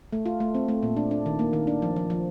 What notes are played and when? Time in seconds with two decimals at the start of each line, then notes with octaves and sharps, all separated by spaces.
0.13 A3
0.26 F4
0.40 A3
0.55 C4
0.68 A3
0.83 A#2
0.97 D4
1.11 D4
1.26 D#3
1.39 A#3
1.53 D#3
1.67 D4
1.82 F3
1.96 F3
2.10 F3